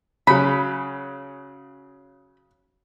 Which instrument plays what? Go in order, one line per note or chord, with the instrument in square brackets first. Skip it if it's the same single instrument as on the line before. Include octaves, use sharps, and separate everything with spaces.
[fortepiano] C#3 F#3 [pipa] B5